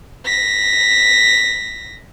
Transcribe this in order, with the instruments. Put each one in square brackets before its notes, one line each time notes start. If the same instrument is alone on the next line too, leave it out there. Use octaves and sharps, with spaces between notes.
[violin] A#6 B6